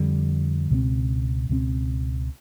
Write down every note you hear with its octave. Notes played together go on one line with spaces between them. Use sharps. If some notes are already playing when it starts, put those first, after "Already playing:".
Already playing: F2 D3 G3
C#2 B2 G#3 C4
C#2 B2 G#3 C4